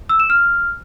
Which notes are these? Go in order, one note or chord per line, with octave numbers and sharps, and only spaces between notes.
E6
E7
F6